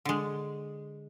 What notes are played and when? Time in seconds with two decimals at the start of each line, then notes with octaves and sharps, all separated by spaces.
0.05 D3 G#3